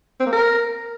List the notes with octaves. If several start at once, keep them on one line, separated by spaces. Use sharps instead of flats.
C4
A#3
A#4